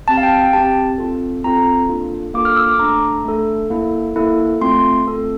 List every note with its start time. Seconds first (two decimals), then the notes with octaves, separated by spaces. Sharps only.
0.08 C4 G4 A5
0.17 F5
0.23 G5
0.39 G5
0.53 C4 G4 A5
0.98 C4 F4 A4
1.44 C4 F4 A4 A#5
1.89 A#3 D4 F4 A4
2.34 A#3 D4 F4 A4 D6
2.45 F6
2.57 E6
2.68 D6
2.79 A3 D4 A4 A#5
3.25 A3 D4 A4
3.70 A#3 E4 A4
4.16 A#3 E4 A4
4.61 A3 C4 F4 A4 C6
5.07 A3 C4 F4 A4